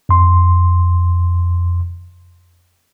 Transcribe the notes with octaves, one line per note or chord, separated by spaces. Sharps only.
F2 C6